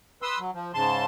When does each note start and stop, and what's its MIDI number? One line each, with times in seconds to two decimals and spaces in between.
0.22 0.39 71
0.22 0.39 84
0.22 0.39 87
0.22 0.39 88
0.39 0.51 54
0.54 0.72 53
0.74 1.06 44
0.74 1.06 49
0.74 1.06 81
0.74 1.06 84